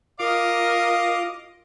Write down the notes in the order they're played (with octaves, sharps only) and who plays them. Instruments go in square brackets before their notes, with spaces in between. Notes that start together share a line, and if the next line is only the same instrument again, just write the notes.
[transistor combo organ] F4 D6 [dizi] A#4 [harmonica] D#5 [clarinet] F5